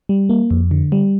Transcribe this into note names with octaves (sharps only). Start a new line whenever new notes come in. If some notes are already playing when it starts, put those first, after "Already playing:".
G3
A#3
F2
D3
G3